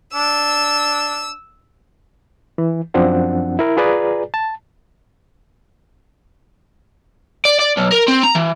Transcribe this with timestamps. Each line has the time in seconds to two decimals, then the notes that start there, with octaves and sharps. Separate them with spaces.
0.15 D4 E6
2.58 E3
2.94 F#2 F3 C4 D4 F#5
3.59 E4 A#4
3.77 F4 G#4 B4 D5 G#5 A#5
4.34 A5
7.45 D5
7.59 D5
7.77 B1
7.92 A#4
8.08 C4
8.23 A#5
8.35 E3